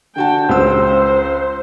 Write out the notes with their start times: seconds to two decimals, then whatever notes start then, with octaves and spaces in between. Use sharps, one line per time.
0.16 D3 F#4 G5 A5
0.49 C#2 C#3 C5 E6